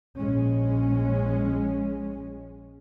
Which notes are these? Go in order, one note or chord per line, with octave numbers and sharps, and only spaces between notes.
A#1 G#3 C#4